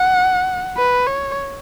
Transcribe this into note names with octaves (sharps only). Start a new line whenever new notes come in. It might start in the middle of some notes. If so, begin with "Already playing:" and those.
Already playing: F#5
B4
C#5